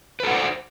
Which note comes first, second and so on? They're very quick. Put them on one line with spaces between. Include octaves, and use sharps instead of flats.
B4 A4 F#5 D5 C5